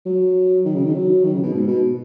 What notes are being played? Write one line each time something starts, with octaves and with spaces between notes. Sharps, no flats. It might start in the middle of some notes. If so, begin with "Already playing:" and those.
F#3
D#3
C#3
D#3
F#3
D#3
C#3
B2
G#2
B2